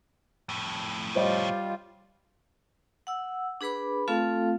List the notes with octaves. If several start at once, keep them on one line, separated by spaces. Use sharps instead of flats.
F2 A2
G3 F4 C5 C#5 D#5
F#5 E6
D4 G#4 B4 B5 D6
A3 C4 F4 A4 F5